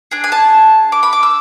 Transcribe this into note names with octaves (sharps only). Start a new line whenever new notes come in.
D4 G#4
G#5
A5
D6
B5
D6
E6